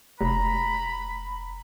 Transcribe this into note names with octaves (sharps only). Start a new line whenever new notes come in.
F1 A#5 B5